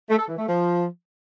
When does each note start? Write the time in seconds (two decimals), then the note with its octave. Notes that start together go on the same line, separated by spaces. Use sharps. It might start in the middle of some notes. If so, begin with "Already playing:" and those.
0.09 A3
0.19 A4
0.28 E3
0.38 A3
0.47 F3